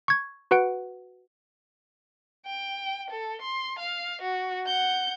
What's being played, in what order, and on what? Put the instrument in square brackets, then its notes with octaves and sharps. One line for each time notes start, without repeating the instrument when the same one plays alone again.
[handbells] C#6 G#6
F#4 B4 F#5 D7
[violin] G5
A4
C6
F5
F#4
F#5 G6